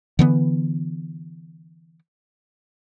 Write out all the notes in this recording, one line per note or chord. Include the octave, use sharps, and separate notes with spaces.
D3 E3 B3